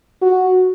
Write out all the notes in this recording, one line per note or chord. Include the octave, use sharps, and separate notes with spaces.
F#4